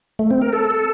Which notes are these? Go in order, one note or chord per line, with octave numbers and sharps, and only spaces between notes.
A3
C4
A#4
A4